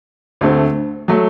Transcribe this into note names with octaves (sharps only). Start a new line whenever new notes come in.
D2 D3 A3 C4
F#3 A3